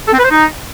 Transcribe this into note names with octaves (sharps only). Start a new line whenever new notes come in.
A4
C4
B4
C5
D#4